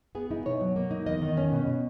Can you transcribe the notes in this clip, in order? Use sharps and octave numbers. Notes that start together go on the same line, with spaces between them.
B3 G#4
D#4 E4
B2 C#5
F#3
A#3
D#4
E2 D#5
D#3
C#4
B2
B2